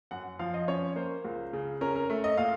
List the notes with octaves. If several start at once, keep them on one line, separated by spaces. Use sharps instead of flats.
F#2 F#5
F3 F5
D#5
C#4 C#5
A#3 C5
C#2
C#3
C#4 A#4
A#4
A3
D#5
A#2 F5